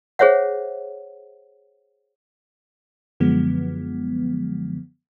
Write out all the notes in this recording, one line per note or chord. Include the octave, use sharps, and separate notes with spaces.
G#4 C5 C#5 E5 F#5
F#2 D3 F3 F#3 G#3 B3